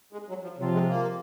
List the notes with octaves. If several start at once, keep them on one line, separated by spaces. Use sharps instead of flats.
G#3
F#3
F3
C3 F3 F#3 C4 F4
G#3
A#3